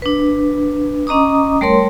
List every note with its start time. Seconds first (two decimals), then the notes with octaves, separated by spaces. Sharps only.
0.02 D4 B4
1.07 C#4 D#5 A#5 D6 D#6
1.61 G3 A3 A#4 C#5 C6